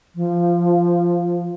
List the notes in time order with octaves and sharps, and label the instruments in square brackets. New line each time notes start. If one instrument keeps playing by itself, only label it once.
[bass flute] F3